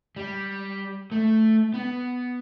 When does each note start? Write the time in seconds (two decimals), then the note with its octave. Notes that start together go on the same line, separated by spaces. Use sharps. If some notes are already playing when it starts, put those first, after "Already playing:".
0.16 G3
1.12 A3
1.74 B3